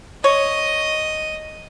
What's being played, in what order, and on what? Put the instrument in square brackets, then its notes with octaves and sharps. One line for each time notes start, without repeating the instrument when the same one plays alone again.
[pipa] C#5 [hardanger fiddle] D#5 D#6